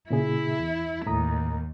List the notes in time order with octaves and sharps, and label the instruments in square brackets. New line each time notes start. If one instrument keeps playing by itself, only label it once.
[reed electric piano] A#2 C#3 G#4 [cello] E4 E5
[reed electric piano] E2
[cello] D#2 [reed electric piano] A2 A#5 D#6